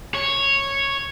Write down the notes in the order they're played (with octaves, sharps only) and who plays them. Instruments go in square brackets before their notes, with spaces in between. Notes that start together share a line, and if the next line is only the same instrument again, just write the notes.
[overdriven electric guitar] C#5